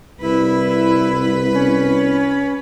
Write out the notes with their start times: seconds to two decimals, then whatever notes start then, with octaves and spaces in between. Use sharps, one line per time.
0.21 C2 E4 B4
1.53 C#4